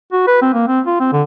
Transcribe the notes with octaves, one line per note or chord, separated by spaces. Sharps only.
F#4
B4
C4
A#3
C4
F4
C4
D3